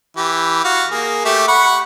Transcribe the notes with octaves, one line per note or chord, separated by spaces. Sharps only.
E3 G4
F#4 F5
A#3 G#4
A3 G4 E5
F#5 B5 C#6